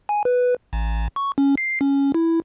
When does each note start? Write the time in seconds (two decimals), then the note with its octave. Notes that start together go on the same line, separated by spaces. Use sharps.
0.09 G#5
0.25 B4
0.73 A1
1.16 C#6
1.38 C#4
1.57 C7
1.81 C#4
2.14 E4